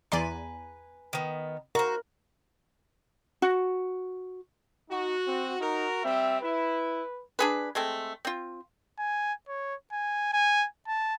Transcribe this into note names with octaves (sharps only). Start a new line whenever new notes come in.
E2 B4 D5 G#5 A#5 C6
D#3 B3
F#4 A#4 C5
F#4
D#4 F#4
C4
D#4 F#4 A#4
G3 C4 E5
E4 B4
D4 G#4 B4
G#3 A3 C4
C4 F4
G#5
C#5
G#5
G#5
A5